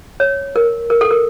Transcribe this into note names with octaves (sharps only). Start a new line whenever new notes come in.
C#5
A#4
A#4
A4
A#4